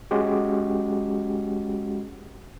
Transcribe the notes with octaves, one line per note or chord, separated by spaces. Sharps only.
G#3 C#4 F#4 G4